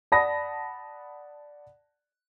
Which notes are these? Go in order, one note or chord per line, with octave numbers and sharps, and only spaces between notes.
D5 F#5 A5 B5 D#6 A#6